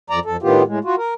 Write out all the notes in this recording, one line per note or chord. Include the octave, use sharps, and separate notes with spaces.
F2 D5 A#5
F2 A4
A2 D#3 B3 F4 G4
A2 G#3
F4 F#4
A#4